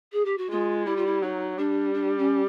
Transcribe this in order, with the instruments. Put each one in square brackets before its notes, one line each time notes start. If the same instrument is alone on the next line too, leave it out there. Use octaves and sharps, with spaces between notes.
[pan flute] G#4
G4
F#4
[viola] G#3 [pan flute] F4
[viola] G3 [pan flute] E4
[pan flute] F4
E4
[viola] F#3 [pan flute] D#4
[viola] G3 [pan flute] D4
[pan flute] D4
C#4